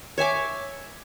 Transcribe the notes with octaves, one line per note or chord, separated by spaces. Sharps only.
C#5 E5 G#5 D6